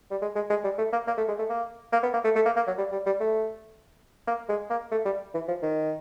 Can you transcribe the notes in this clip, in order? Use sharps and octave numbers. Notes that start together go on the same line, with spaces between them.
G3
G#3
G#3
G#3
G3
A3
A#3
A#3
A3
G#3
A3
A#3
A#3
B3
A#3
A3
A3
A#3
A#3
F#3
G3
G3
G3
A3
A#3
G#3
A#3
A3
G3
E3
F3
D#3